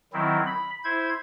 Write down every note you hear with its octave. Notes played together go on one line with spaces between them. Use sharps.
D#3 F#3 C4 E4
B5
E4 C5 G#6